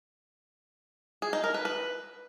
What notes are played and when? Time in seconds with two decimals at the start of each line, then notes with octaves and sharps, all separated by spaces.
1.22 G#4
1.33 D#4
1.44 A#4
1.54 B4
1.65 B4